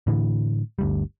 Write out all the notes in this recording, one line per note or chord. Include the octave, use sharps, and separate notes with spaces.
A2 D3 E3
G1 D2 G3